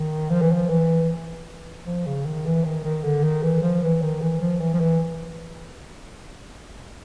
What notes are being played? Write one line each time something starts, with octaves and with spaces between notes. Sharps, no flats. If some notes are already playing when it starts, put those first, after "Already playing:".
Already playing: D#3
F3
E3
F3
E3
F3
C#3
D#3
E3
D#3
D#3
D3
D#3
E3
F3
E3
D#3
E3
F3
E3
F3
E3